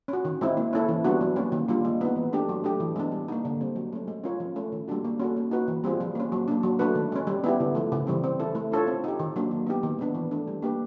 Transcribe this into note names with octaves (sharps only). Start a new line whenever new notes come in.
C#4
F#4
D#3
G#3 C4 E4
A#3
C#4 E4 A4
E3
G3 B3 D4 F#4
F#3
A#3 C#4
D#3
G3 A#3 D4 F4
G#3
B3 D#4
E3
A3 D4 G4
F#3
A3 D4 G4
E3
G#3 B3 D4
G3
A#3 D#4
D3
G3 C4
F#3
A3 C#4
G#3
C#4 F4 A#4 C#5
F3
A3 C#4
D#3
G3 A#3 D4 F#4
A#3
C#4 F#4 A4
A#3
D#4 F#4 B4
E3
G3 C4 F4 G#4
F3
A#3 C#4
F#3
A#3 D4
F#3
A3 D4 F#4 B4
D#3
G#3 C#4
G3
B3 E4 G4
D3
F3 A3
C#3
E3 G3 C4
C4
E4 A4
A3
D4 F4 A4 C#5
C4
D#4 G4
D#3
F#3 A#3 D4
F#3
B3 D#4 G4
D#3
G#3 B3 D4
E3
A3 D4
G3
A#3 D4 G4 B4